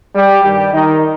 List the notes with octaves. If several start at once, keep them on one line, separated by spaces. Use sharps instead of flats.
G3 G4
G2 D#3 G3 G4
D#3 D#4